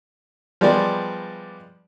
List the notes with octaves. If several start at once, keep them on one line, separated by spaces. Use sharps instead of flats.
F3 G3 G#3 B3 D5